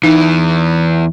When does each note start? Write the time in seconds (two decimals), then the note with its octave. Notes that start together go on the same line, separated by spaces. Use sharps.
0.03 E2 E3 D#4